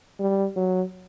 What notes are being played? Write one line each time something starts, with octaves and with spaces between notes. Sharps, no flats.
G3
F#3